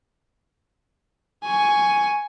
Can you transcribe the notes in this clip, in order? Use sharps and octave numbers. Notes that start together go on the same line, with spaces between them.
G#5 C#6